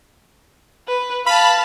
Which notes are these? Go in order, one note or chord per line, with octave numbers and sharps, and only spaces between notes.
B4
F5 A5 B5